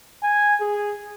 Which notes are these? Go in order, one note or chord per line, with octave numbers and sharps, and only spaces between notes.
G#5
G#4